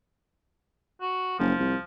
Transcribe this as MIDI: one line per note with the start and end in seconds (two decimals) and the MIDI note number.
1.01 1.35 66
1.39 1.54 30
1.39 1.84 53
1.59 1.75 36